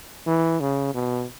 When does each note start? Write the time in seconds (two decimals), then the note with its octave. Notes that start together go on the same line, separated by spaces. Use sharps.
0.27 E3
0.60 C#3
0.95 B2